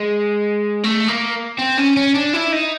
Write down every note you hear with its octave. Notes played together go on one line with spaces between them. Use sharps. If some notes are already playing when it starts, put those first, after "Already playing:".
Already playing: G#3
A3
A#3
C4
C#4
C#4
D4
E4
D#4